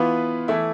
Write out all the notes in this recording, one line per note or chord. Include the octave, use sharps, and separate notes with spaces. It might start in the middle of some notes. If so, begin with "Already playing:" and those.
Already playing: E3 B3 F4 B4
E3 A3 E4